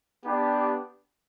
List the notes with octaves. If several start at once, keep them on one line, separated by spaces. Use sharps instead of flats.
B3 D4 G4